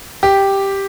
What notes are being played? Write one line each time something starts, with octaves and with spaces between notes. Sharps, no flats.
G4